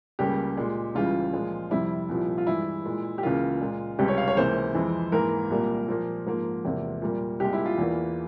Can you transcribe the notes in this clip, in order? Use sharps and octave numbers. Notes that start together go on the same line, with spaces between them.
C#2 C#3 G3 A#3 G4
A#2 G#3
C#2 C#3 E3 G3 F4
A#2 F3 G#3
F2 C3 G3 E4
C2 A#2 F3
F4
G2 E3 G#3 E4
A#2 G#3
G4
C#2 C#3 E3 A#3 F4
A#2 G#3
C#2 C3 G3 G4
C#5
F5
C#5
C#2 C3 E3 A#3 C5
F2 E3 G#3
G#2 E3 A#3 A#4
C2 A#2 G3 A#3
A#2 F3 A#3
G#2 F3 A#3
E2 C3 F3 A#3
A#2 G3 A#3
C2 A#2 G#3 G4
E4
F4
E2 E3 A#3